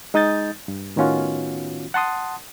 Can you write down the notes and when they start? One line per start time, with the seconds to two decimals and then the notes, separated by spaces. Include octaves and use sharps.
0.14 G#3 D#4 D#6 G6 A6
0.68 G2
0.96 A2 D#3 B3 C#4 F4 F#4
1.94 F#5 A5 C6 D#6